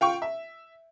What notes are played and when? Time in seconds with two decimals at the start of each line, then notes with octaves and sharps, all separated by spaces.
0.01 F4 G5 C#6
0.22 E5